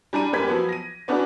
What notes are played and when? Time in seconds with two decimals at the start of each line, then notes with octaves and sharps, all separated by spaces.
0.13 G3 D4 A#5 D#7
0.33 F#2 A#3 G4 B4 G#6 B6
0.48 F3 F#3 B3
0.69 A#6 D#7
1.08 B3 C#4 D4 F#4 B4 D5